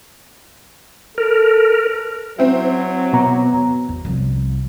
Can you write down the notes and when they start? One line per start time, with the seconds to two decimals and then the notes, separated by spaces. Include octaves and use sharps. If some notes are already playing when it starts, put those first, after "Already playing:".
1.18 A4 A#4
2.39 F#3 C4 E4
3.13 B2 B3 A#5
3.89 E2
4.05 C2 F3